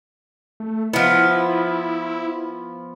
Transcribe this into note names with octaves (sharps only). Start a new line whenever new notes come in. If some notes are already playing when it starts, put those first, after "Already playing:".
A3
F3 B3 E4